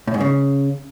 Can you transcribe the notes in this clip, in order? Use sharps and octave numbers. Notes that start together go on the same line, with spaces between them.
A2
G#2
C#3